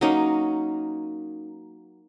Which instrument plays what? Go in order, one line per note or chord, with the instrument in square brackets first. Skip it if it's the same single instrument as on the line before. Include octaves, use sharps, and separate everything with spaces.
[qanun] F#3 A#3 C#4 D#4